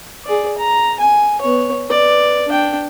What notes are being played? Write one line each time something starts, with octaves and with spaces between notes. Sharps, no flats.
G#4 D5
A#5
G#5
B3 C#5
B4 D5
D4 G5